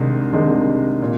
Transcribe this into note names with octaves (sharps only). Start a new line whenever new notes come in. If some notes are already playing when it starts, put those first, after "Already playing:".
Already playing: C2 C3 D#3 G#3 D4 D#5
C2 C3 D#3 G#3 D4
A#2